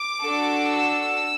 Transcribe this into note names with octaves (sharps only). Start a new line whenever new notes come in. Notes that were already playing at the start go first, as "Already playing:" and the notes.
Already playing: D6
D4 F#4 A4
E6